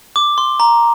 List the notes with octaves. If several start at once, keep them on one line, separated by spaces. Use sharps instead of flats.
D6
C6
A#5